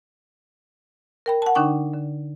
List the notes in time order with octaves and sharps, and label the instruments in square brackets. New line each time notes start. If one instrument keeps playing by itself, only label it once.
[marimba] A#4 G5 B5
F#5 A5
D3 D4 D#4 G5 C#6
D3